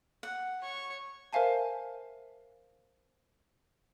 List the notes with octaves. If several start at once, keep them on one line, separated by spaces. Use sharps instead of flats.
F#5
C#5 C#6
A#4 C5 E5 F5 G#5 A5